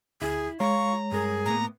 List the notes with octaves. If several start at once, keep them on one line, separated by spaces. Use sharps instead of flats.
D2 E4 G#4
G#3 F4 C#5 A#5 C#6
G2 G#4 A#4
A2 A#3 B3 A#5